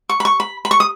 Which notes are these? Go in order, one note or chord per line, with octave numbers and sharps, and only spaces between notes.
C#6
B5
C#6
B5
B5
C#6
D#6